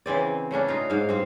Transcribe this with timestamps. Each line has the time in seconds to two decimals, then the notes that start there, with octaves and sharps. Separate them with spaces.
0.06 C#3 E3 C4 D5
0.51 C#3 A3 C#4 D4
0.68 D#4 F4
0.90 G#2 F5
1.09 G2 C4 C5